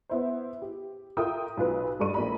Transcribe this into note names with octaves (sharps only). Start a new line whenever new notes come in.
B3 E4 C5
G4
F4 A4 A#4 E5 G5 D#6
B1 F4 B4
G2 A4 D5 C#6 D#7
A#1 F3 A#3 D5 A#5 B5